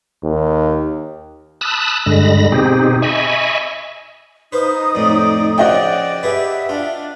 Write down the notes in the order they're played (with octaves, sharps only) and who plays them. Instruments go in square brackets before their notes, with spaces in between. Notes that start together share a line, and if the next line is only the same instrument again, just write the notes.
[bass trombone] D#2
[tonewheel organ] A5 B5 D#6 E6 F#6
G2 D3 G#3 B5 A#6
B2 C4 D#4 G4 G#4
D#5 E5 G#5 B5 C#6
[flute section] D#4 D#6 [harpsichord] B4 C5 F5
[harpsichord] F2 A2 [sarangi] D5
[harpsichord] C#3 F3 [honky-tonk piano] F#4 D#5 G5 [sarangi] D5
[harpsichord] G4 G#4 B4 [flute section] E5
[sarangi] D4 [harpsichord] F4